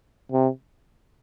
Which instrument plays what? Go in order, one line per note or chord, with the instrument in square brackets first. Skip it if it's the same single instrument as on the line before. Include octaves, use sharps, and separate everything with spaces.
[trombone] C3